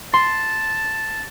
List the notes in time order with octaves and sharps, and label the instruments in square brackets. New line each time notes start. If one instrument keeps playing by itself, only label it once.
[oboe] A5 [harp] C6